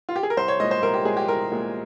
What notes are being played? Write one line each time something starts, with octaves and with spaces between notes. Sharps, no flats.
F4
G4
G#4
A#4
C2 C5
C#5
A#2 G#3 D#5
C5
C2 A#4
G4
A#2 G#3 G#4
G4
C2 A#4
A#2 G#3